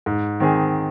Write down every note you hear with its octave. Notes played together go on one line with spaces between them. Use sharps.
G#2
D#3 C4 G#4